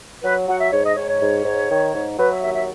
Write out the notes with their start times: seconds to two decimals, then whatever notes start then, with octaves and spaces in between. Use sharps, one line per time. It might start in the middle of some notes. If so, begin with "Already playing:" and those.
0.24 F#3 B4
0.48 F#3 F#5
0.60 E5
0.72 G#2 C#5
0.84 D#5
0.96 G#2 C#5
1.09 C#5
1.21 G#2
1.45 G#2
1.70 D#3
1.94 G#2
2.19 F#3 B4
2.30 E5
2.42 D#2 E5
2.55 E5